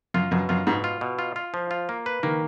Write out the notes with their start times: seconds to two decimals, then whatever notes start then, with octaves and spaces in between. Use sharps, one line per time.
0.14 F#2 F4
0.31 F#2 B2
0.49 F#2 F4
0.67 G#2 B2
0.84 F4
1.01 B2
1.19 F4
1.36 F4
1.54 F3
1.71 F4
1.89 A#3
2.06 B4
2.23 D#3 A#3